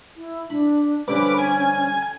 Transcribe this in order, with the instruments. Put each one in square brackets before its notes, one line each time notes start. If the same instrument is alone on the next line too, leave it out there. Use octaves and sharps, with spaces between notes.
[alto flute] E4
[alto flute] D4 [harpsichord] B5
[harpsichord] G2 D3 F3 [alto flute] C#4 [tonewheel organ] B4 D6
[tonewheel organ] G#5